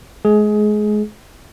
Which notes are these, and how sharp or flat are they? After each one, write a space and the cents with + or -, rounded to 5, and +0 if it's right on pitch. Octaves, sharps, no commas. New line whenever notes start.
G#3 +30 G#4 +20